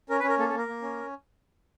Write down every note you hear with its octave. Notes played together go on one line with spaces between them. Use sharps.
C#4 A#4
B4
C#4
A#4
A#3 A4
A4
A#3
A#4
A#3
C#4